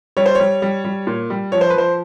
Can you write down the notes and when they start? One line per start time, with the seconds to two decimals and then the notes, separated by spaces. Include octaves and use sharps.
0.17 G3 C#5
0.26 C5
0.35 G3 C#5
0.62 G3
0.84 G3
1.07 A#2
1.30 G3
1.52 F3 C#5
1.61 C5
1.70 B4
1.74 F3 C5